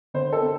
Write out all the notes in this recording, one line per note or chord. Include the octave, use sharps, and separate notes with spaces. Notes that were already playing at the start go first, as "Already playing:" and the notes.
D3 C5
A4
C4